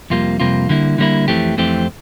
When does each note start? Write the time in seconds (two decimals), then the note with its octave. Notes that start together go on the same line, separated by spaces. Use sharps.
0.10 F2 C3 G3 A#3 F4
0.40 F2 C3 G3 A#3 F4
0.69 D3 G3 A#3 E4
0.98 D3 G3 A#3 E4
1.28 F2 E3 A3 C4 G4
1.57 F2 E3 A3 C4 G4